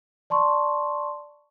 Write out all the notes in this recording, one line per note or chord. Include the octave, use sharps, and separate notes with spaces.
D5 A5 C6 C#6